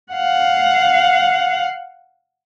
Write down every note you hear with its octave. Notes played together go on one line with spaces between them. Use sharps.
F5 F#5